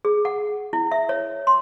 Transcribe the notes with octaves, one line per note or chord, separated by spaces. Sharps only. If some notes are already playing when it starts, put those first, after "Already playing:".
G#4
F#5
E4
E5
C#5
C6